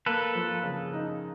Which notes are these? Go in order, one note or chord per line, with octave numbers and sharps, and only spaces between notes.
A#3 A4 B4
F3
C#3
D#4